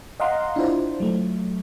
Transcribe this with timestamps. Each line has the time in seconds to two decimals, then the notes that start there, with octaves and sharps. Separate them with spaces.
0.20 D#5 F5 F#5 A#5 C6
0.56 D4 E4 F4 C5
1.00 F#3 A3